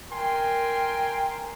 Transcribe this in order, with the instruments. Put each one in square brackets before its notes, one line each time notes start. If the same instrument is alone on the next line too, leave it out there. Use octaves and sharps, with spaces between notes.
[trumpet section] A#4 G5 G#5 C6